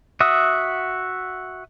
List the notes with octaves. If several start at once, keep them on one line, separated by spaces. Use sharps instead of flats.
F#4 E5 F#5 D#6